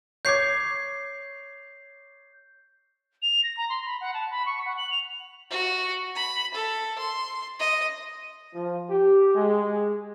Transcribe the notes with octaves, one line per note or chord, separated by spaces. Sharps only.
C#5 D6 G6 G#6 C7
F7
A#6
A#5
C6
B5
F#5
A5
B5
C#6
F#5
F#7
F7
F#4
B5
A4
C6
D#5
F3
G4
G#3